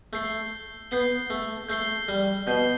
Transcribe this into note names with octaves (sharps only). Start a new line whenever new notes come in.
A3 G6 C7 G7
B3 G6 C7 G7
A3
A3 G6 C7 G7
G3
B2 G6 C7 G7